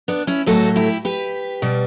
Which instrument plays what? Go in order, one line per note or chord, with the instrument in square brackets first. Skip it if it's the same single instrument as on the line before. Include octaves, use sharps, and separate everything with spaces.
[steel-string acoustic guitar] B3 D4
C#4 E4
A2 F#3 A3 F#4 A4
E4 G4
G4 B4
B2 G3